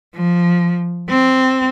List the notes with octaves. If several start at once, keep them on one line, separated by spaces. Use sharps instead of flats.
F3
C4